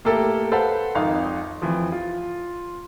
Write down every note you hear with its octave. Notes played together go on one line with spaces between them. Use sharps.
A2 A#3 G4 A4 E5
A4 B4 C5 F5 F#5 A5
G#1 F2 D#4 F5
F2 E3 F3
F4